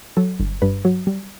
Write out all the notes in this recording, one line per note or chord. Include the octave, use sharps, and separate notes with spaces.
F#3 A4
G1
G2 B4
F#3
G3